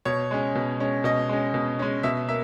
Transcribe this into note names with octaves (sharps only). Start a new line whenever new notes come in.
B2 C#5
G#3 C#4
B2
G#3 C#4
B2 D#5
G#3 C#4
B2
G#3 C#4
B2 E5
A#3 E5